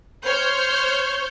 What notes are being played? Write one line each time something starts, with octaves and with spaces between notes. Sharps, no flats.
C5 C#5 F6 G6